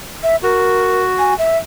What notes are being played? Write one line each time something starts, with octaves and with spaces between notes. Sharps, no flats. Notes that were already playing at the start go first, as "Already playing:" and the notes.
E5
F#4 A#4
G#5
E5